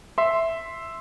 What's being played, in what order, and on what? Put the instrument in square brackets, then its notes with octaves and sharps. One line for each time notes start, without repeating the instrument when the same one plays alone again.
[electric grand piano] E5 C6